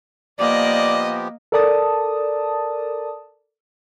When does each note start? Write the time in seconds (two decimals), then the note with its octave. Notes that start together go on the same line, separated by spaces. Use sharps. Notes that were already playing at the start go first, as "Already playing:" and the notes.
0.40 F3 A#3 B3 G4 D5 D#5
1.52 A4 A#4 D5 A5 D#6